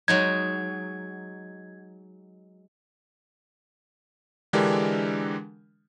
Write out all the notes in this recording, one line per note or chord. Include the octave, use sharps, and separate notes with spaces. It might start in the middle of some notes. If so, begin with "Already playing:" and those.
F#3 G#3 D#4 G#6
D3 E3 G#3 D4 G4 A#4